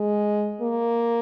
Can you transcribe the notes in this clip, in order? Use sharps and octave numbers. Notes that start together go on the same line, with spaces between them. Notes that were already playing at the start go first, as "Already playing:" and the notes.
Already playing: G#3
A#3